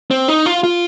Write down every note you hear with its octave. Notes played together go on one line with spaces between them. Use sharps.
C4
D#4
F4
F4